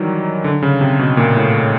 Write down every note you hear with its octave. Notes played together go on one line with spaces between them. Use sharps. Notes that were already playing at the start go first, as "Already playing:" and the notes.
Already playing: D#3 E3 F#3 G3
D3
C#3
C3
B2
A#2
A2